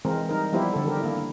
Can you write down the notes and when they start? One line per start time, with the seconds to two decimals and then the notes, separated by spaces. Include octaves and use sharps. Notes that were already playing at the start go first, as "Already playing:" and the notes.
0.05 E3 G#3 C4 A#4
0.29 G3 D#4 A#4
0.52 F3 G3 B3 E4 G4 C5
0.73 D3 A4
0.86 D#3 G3 G4 A#4
1.00 A#3 D4 E4